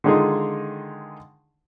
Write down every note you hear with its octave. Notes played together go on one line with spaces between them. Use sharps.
D3 D#3 G#3 D#4 F4 G#4